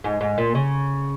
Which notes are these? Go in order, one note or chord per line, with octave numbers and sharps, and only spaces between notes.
G#2
G#2
A#2
C#3